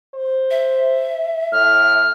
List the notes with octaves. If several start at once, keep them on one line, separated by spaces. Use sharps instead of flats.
C5
E5
A2 F6